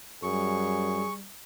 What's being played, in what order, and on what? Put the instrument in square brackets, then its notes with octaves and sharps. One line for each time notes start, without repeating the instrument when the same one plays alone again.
[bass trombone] F#2 [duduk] G3 [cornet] G#4 [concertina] C#6